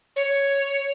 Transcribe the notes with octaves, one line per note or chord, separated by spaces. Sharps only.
C#5